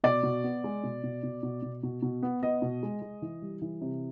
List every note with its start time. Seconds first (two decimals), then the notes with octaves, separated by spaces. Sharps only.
0.04 B2 D5
0.23 B2
0.44 B3
0.64 G#3
0.83 B2
1.04 B2
1.23 B2
1.43 B2
1.63 B2
1.83 B2
2.02 B2
2.23 B3
2.43 B3 D#5
2.62 B2
2.83 G#3
3.02 G#3
3.22 E3
3.42 G3
3.62 E3
3.81 C3